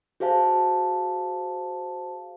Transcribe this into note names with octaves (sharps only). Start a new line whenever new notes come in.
F#4 G#4 C5 F5 A5